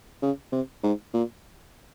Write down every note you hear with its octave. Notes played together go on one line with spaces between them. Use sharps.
C#3
C3
G#2
A#2